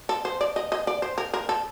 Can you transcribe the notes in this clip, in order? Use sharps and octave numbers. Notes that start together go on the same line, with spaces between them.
A4
C5
D5
D#5
D#5
D5
C5
A#4
A#4
A4